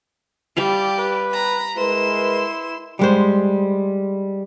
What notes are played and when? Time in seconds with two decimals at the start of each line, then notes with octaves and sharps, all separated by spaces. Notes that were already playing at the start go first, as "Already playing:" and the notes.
0.57 G3 G4 D5 E5 F5
0.99 B4
1.30 A#5 B5
1.77 G#3 E4 A#4 B4 C6 E7
2.99 G3 G#3 C5